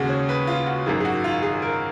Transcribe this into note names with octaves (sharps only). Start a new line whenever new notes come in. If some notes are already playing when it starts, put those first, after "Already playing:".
Already playing: D#2 C#3 G#3 F#4 G#4
C#5
B4
F4
F#4
G#1 F#2 D#3 G#4
G#4
F#4
F4
G#4
A#4